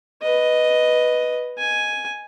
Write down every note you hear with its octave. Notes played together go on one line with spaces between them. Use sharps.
B4 D#5
G#5